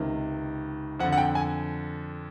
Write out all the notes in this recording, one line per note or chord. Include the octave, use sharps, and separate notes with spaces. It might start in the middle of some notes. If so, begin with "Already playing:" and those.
Already playing: C#2 C3 D#3
F2 D3 F#5
F#5
G5
G#5